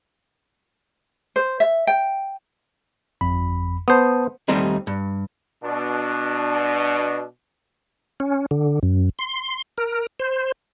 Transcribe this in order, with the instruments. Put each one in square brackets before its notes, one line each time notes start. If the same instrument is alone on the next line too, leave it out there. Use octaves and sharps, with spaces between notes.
[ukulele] C5
E5
G5
[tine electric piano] G1 F2 B5
[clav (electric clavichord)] B3 C5 [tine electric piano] A5 C6 D#6
[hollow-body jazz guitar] D#2 D#3 G3 A3 C4 D#4
G2
[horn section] B2 D4
[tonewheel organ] C#4
D3
F#2
C6
A#4
C5